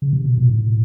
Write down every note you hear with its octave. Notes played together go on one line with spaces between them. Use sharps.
C#3
C3
B2
A#2
A2